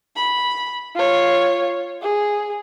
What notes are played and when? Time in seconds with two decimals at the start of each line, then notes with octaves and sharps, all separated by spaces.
0.16 B5
0.96 F4 C#5
2.02 G#4